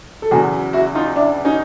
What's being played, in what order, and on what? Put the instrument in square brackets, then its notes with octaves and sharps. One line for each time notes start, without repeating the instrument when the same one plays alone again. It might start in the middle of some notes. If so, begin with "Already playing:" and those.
[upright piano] A4
E2 C#3 F#3 F#4 G#4
E4 F#4
D#4 F4
D4 E4
C#4 D#4